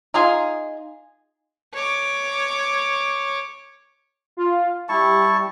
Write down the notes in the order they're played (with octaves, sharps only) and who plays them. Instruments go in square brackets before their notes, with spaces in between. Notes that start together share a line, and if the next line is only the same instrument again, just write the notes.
[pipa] D#4 F4 G#4
[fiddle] C#5 D6
[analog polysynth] F4
[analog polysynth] G3 G4 [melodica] E4 A5 C#6